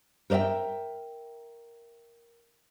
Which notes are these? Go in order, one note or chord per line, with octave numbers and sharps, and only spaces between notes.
A#4 C5 D5 E5 G5